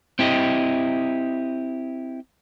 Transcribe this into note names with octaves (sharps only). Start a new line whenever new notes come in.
C4 E4 G4 D#5